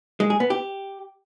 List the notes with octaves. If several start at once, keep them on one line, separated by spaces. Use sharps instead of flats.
G#3
G#4
B3
G4